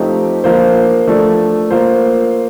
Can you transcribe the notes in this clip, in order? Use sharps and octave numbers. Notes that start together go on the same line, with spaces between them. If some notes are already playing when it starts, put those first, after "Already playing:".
Already playing: F3 A3 C4 D#4 G4
F3 A#3 F4 C5
F3 A3 D4 A4
A#3 F4 C5